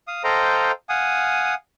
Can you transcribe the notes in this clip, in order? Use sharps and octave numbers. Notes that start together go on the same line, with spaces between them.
F5 D#6
A4 C5 D#5 F5 G5 A#5
F5 F#5 G#5 D#6